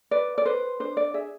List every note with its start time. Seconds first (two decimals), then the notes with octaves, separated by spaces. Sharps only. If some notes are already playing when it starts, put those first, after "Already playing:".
0.11 B4 D5
0.38 D5
0.46 B4 C5
0.80 D4 C5
0.97 D5
1.14 G#4 E5